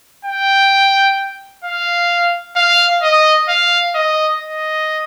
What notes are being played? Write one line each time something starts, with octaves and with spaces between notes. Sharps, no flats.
G5
F5
F5
D#5
F5
D#5
D#5